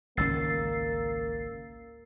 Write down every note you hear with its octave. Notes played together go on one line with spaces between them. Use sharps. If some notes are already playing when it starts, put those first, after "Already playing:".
G#1 C#2 A#3 C#4 E6 A6 C7